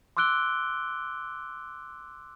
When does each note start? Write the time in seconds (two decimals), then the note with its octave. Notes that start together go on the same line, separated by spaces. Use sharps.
0.17 C6 D6 E6 F#6 D7 G7